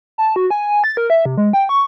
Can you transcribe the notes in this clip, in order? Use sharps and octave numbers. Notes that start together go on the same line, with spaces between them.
A5
F#4
G#5
A6
A#4
E5
C3
G#3
G5
C#6